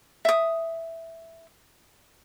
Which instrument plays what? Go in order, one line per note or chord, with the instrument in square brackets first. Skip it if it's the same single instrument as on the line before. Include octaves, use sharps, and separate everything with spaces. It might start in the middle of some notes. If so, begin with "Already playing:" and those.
[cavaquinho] E5 D#6